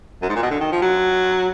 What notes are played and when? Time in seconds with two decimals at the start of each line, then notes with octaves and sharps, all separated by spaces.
0.22 F#2
0.29 G#2
0.35 A#2
0.42 B2
0.51 D3
0.61 D#3
0.72 F3
0.82 F#3